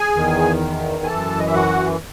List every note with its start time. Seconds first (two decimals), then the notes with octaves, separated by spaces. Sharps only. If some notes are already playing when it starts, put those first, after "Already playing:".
Already playing: G#4 G#5
0.15 E2 D#3
1.03 G#5
1.07 F#2 E3 A4 A5
1.39 D#5
1.47 E5
1.54 F#4 F#5